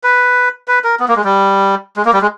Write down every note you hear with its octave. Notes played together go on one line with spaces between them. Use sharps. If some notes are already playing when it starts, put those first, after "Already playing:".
B4
B4
A#4
B3
A#3
G#3
G3
G#3
A#3
G3
G#3